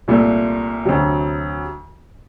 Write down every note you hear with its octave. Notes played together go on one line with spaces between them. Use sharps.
C2 A#2 A3
D2 C3 F#3